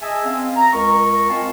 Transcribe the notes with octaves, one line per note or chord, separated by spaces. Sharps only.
G#4 D#5 E5 G#5 A5 E6
C4 C#4 F5
A#5
C#2 A#4 D#5 C#6
C4 F4 D#5 F5 G#5 A5